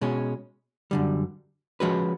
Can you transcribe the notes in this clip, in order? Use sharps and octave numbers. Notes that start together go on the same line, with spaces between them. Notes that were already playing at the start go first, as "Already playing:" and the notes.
B2 G#3 C#4
F#2 D3 G3
F3 G#3 C#4 F#4 B4